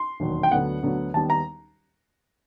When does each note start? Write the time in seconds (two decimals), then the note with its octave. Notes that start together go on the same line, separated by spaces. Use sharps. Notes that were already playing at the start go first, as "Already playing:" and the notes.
Already playing: C6
0.20 E1 D#2 D#3 F#3
0.43 G5
0.51 D2 D3 F#3 B3 F#5
0.83 D2 D3 F#3 B3
1.14 D#2 D#3 G3 B3 A5
1.30 A#5